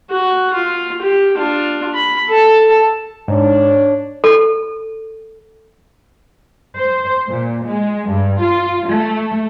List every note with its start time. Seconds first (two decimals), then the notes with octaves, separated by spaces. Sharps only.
0.10 F#4
0.54 F4
1.02 G4
1.37 D4 F4
1.95 B5
2.29 A4 A5
3.28 G#2 D4 C#5
4.24 A4
6.77 C5
7.30 A#2
7.66 G#3
8.09 G2
8.41 F4
8.89 A3